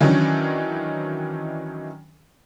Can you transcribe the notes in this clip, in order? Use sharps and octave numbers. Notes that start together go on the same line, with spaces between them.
D#3 E3 F#3 C#4 D4